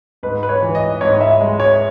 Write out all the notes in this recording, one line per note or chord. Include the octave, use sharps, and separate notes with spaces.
G#2 B4
B4
C#5
E3
D#5
G#2 C#5
E5
G#3
C#5